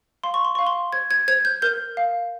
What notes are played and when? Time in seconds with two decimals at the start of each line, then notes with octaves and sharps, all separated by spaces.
0.24 F5 C6
0.34 C#6
0.45 C6
0.55 F5 C#6
0.67 C6
0.93 C5 G#6
1.11 G#6
1.28 C5 G#6
1.45 G6
1.62 A#4 G6
1.97 F5